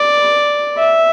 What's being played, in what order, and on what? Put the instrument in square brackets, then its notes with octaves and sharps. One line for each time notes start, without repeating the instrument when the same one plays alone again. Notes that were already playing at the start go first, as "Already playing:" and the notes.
Already playing: [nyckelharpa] D5
E5